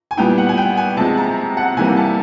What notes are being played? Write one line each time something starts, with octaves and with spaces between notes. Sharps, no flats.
G#5
A#2 G3 B3 E4 G5
F#5
G#5
G5
G#5
C3 F3 G#3 A5
A#5
F#5
C3 E3 G3 A#3 G#5
A5